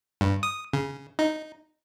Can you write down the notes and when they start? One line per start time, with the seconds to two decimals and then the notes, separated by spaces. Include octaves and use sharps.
0.21 G2
0.43 D#6
0.73 C#3
1.19 D#4